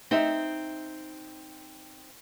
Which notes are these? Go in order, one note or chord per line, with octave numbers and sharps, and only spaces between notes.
C4 D#4 E5